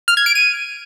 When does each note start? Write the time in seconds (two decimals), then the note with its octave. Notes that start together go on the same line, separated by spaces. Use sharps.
0.08 F6
0.17 G#6
0.26 D7
0.35 D#7